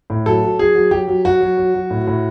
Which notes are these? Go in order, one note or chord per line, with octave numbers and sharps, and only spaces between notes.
A2
F#3 A4
F#3
F#3 G#4
F#3
F#3 G4
F#3
F#3 F#4
F#3
F#3
F#3
A2
A2